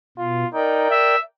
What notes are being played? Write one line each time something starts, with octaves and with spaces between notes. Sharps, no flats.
B2 F4
D#4 A#4 D5 G5
E5